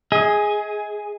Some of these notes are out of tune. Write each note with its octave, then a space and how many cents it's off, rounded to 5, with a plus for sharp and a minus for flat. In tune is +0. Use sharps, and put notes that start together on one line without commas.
G#4 +0 D#5 +35